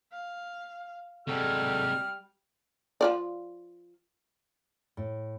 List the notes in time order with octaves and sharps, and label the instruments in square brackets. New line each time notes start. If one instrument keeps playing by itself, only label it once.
[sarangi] F5
[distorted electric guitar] C3 G#3 [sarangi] G3 [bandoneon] F#4 A4 [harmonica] F6
[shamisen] F3 F4 D5
[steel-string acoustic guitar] A2